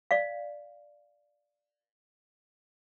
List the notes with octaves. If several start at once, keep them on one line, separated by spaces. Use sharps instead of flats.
D5 F5